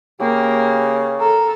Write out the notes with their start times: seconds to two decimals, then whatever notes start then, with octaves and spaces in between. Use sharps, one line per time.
0.20 C#3 A#3 G4
1.20 A4 A#4